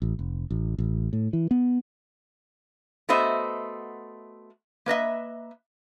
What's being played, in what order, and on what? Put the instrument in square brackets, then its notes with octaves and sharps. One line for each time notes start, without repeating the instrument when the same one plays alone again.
[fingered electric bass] A1
F1
A1
A1
A2
E3
B3
[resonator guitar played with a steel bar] A3 B3 F#4 C5 D#5 E5
A#3 B4 D#5 E5